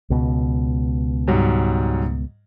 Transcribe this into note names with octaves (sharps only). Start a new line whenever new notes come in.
C#2 B2
G#2 F#3 G3